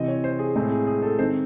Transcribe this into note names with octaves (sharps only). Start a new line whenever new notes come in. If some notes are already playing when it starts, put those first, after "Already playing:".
Already playing: C3 E3 C4 D#5
C#5
C5
G#4
A2 G#3 C4 G#4
G#4
G#4
A4
D#3 G#3 C4 C5